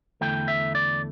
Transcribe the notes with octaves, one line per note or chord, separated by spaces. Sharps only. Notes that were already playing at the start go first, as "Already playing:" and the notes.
E2 D3 A3 E4 G5
E5
D5